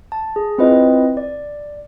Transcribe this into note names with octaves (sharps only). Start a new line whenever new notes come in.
A5
G#4
C4 E4 F4 B4 D#5
D5